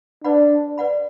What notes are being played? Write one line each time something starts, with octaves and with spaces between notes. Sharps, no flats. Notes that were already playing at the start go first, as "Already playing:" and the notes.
D4 B4 D5 F#5 B5
B4 D5 F#5 B5